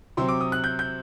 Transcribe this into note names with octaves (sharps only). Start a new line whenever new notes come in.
C3 F#3 C4 C6
D6
D#6
F#6
G6
G6